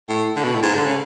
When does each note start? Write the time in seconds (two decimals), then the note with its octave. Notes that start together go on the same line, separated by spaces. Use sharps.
0.09 A2
0.36 D3
0.44 B2
0.54 A2
0.62 G#2
0.75 D3
0.86 C#3